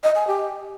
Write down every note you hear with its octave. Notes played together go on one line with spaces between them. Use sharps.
D#5
G#5
G4